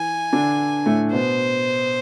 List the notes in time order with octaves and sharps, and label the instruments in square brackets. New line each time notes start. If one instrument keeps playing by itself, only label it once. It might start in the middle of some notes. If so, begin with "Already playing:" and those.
Already playing: [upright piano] E3 [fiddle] G#5
[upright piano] D3 D4
A2 A3
[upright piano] B2 B3 [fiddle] C5